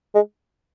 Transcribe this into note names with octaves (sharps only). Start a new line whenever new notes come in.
G#3